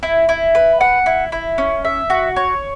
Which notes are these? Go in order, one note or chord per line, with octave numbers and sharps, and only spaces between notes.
E4
E4
B4
F#5
E4
E4
C#4
E5
F#4
C#5